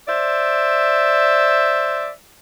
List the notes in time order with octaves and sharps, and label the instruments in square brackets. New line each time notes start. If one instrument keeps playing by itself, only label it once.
[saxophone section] C5 D5 E5